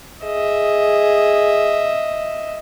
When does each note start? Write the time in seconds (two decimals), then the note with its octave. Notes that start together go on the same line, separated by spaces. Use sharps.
0.24 G#4 D#5 E5